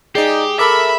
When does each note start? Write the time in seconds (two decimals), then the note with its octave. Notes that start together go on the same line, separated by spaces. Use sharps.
0.15 D#4 G4 G#4 D5 C7
0.59 A4 A#4 E5 B5 D6